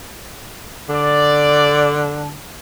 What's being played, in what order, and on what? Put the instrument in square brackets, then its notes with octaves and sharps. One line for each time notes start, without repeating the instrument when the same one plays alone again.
[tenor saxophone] D3 [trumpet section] D5